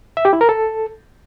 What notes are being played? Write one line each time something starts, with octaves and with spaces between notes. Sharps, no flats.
E5
G4
E4
A#4
A4